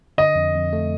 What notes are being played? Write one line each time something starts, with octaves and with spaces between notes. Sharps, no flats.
D3 D#5
F2
F2
A3